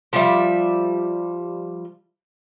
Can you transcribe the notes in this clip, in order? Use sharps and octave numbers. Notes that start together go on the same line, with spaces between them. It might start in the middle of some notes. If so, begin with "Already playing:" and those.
F3 G3 E5